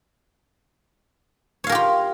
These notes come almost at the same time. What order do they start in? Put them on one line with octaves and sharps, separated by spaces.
C#5 F5 A#4 G4 F4